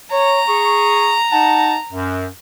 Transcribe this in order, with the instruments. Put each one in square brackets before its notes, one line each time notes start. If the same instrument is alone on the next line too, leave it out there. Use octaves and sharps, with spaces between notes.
[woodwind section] C#5 [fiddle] A#5
[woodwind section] G#4 C#6
D#4 F#5 A5
F#2